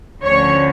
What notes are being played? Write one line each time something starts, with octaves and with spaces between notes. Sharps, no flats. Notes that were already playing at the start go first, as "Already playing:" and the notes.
D2 D3 F3 C#4 C#5